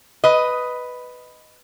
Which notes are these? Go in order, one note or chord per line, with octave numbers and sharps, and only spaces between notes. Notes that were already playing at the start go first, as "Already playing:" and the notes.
B4 D#5